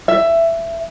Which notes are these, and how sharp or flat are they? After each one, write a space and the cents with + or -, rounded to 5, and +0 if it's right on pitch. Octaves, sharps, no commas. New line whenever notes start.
E5 +15